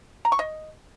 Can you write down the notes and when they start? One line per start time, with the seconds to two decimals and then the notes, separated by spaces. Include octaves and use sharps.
0.25 A#5
0.32 C#6
0.39 D#5